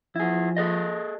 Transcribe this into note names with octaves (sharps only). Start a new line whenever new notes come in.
F3 E4 G#4
G#4 A4 D#5